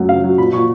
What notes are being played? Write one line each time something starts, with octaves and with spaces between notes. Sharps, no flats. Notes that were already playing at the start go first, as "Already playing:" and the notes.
Already playing: F#2 F#3 A3
C#3 F5
F#3
A#2 B5
A#2 C#6